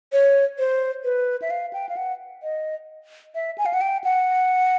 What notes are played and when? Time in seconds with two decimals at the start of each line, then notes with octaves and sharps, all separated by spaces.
0.12 C#5
0.59 C5
1.04 B4
1.42 E5
1.50 F5
1.73 G5
1.89 F5
1.97 F#5
2.43 D#5
3.35 E5
3.58 G#5
3.66 F5
3.73 F#5
3.81 G5
4.04 F#5